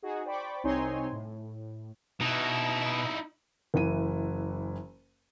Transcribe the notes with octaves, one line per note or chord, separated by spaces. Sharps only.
D#4 F#4 G#4
C5 D5 G5 B5 C#6 D6
C2 C4 D#4 C#5 G#5 C6
A2
B2 D#4 E4
F#1 E3 D#7